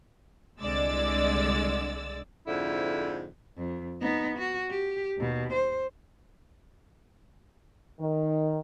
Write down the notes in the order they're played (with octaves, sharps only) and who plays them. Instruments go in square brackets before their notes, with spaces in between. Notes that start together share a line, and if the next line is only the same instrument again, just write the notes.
[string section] C2 D3 G#3 D5 E6 A6
[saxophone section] F2 G#2 D3 E4
[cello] F2
B3 D#4
F#4
G4
D#2 B2
C5
[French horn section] D#3